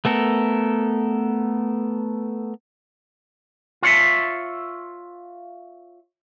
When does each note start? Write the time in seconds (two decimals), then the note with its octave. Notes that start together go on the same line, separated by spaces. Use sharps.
0.05 A3 B3 A4 A#4
3.82 F4 C#5 E5